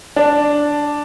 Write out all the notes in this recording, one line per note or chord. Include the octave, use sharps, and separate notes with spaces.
D4